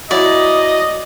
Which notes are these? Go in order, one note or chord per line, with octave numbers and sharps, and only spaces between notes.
F#3 E4 D5 D#5